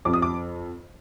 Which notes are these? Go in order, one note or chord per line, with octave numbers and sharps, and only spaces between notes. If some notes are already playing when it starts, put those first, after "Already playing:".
F2 D6
D#6
D6